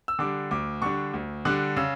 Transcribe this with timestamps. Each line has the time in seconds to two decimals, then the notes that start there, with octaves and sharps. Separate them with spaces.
0.08 E6
0.19 D3 G3 D4 D6
0.51 D2 D6
0.82 D3 G3 D4 C#6
1.13 D2
1.45 D3 G3 D4 F#6
1.77 C#3 E6